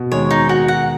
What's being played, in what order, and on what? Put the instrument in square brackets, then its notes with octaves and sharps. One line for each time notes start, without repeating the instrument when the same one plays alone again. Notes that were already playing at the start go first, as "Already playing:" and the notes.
Already playing: [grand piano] B2
[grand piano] D#3 G#3 [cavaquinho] C#5
[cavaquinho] D#4
F#4
F#5